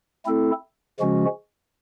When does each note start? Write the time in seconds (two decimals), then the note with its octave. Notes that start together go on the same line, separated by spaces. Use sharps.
0.26 A3 C4 E4 A4
1.00 C#3 F3 G#3 C#4 F#4